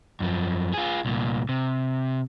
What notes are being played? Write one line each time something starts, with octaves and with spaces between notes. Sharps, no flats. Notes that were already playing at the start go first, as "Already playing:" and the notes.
F#2 F3
F4 G#4
C2 A#2
C3